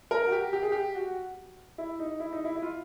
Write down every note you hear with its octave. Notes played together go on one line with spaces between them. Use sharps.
A#4
F#4
G4
G4
G#4
G4
F#4
E4
D#4
E4
D#4
E4
E4
F4